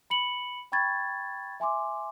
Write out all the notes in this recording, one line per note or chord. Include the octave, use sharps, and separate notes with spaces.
B5 C#7 F#7
G5 B5 C#6 G#6 A6
E5 G#5 C6 D6